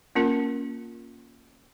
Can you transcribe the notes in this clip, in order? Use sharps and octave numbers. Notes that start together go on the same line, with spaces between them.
A#3 C#4 F4 A#4